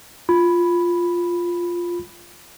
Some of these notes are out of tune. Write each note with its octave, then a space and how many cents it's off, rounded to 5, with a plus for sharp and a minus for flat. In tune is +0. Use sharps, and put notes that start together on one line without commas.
F4 +0 B5 +0